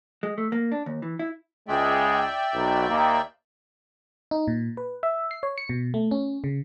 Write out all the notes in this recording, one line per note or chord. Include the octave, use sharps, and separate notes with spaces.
G#3
A3
A#3
D4
D#2
E3
E4
C#2 G#3 D5 E5 G5
B1
D#2 A#3
D#4
A#2
B4
E5
C7
C#5
C#7
B2
A3
C#4
C#3